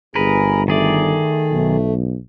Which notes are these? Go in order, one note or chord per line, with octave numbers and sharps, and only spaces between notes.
G1 G#4 A#4 B4
D#3 A3 G#4 D5
B1